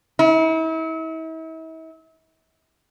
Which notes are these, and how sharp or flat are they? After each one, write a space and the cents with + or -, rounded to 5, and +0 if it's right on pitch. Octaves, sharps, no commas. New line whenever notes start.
E4 -40